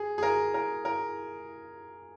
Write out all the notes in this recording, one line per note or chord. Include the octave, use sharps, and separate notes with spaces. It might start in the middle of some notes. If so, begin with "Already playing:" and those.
Already playing: G#4
G#4
A#4
A#4
A#4